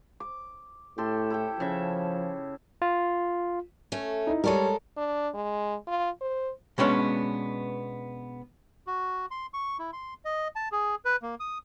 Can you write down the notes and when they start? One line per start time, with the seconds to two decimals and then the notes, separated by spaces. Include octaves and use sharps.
0.20 D6
0.98 A2 G4 A4 C6
1.30 E4 A4 G5
1.60 C#3 F3 E5
2.82 F4
3.92 A3 C#4
4.27 D#4 E4
4.44 G3 G#3 A4 A#4 C#5
4.97 D4
5.35 G#3
5.87 F4
6.21 C5
6.78 B2 G#3 B3 C#4 D4
8.87 F#4
9.31 C6
9.54 C#6
9.79 E4
9.93 C6
10.25 D#5
10.56 A5
10.72 G#4
11.05 B4
11.22 A#3
11.40 D#6